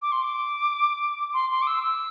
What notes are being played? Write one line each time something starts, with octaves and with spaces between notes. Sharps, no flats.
D6
C6
D6
C6
C6
D6
E6
E6